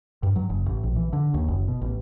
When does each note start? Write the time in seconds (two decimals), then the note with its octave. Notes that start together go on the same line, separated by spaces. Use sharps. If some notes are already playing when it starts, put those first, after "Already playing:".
0.23 G2
0.36 F#3
0.50 F#1
0.66 A1
0.84 A#1
0.96 E3
1.13 D3
1.34 D#2
1.48 F#1
1.68 B2
1.81 A1